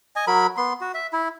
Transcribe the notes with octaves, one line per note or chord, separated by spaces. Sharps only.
D#5 G#5
F#3 A#4 B5
B3 C6
F#4
E5
E4